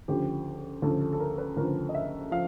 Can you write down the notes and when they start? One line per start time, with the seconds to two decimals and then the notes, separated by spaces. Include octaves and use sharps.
0.08 D2 C#3 F3 G4
0.82 D2 C#3 F3 A4
1.01 A4
1.13 A4
1.20 A#4
1.38 B4
1.57 D2 C#3 F3 A#4
1.89 D#5
1.95 E5
2.31 F3 F5